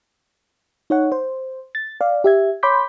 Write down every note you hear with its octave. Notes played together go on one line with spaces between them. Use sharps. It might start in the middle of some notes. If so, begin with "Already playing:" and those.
D#4 C#5 F#5
C5
A6
D5 F5
G4 E5 G#6
C#5 B5 C6 D6 G6 B6